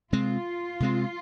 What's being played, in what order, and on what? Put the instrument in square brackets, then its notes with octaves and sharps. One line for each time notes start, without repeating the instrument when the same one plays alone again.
[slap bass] C3 G#3 C4 [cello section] F4
[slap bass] C3 G#3 C4